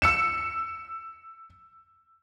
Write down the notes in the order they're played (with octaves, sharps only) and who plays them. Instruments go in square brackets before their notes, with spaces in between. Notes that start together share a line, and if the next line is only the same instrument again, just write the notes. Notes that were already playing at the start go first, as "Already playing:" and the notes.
[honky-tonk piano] E6 C#7 E7